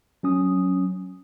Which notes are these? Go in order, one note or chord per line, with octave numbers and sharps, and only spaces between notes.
F#3 C#4 D#6